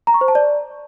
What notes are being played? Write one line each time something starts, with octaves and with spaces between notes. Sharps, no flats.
A#5
C#6
C5
A5
D5